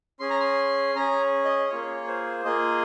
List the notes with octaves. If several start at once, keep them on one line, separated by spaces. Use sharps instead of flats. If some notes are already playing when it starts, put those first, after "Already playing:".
C#4 G#4 C6
A#5
C6
C#4 G#4 A#5
D#5
A#3 F4 G#4 C#5
C5
A#3 F4 G#4 D#5